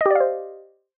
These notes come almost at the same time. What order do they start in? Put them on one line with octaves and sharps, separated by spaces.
D#5 G4 D5 F5 C5